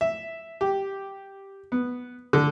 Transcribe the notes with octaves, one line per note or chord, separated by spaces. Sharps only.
E5
G4
B3
D3